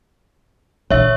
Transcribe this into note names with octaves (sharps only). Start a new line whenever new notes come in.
A#1 D3 C#5 E5